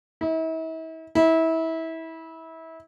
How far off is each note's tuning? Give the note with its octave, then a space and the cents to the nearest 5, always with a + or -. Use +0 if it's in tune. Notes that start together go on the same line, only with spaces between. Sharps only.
E4 -40
E4 -25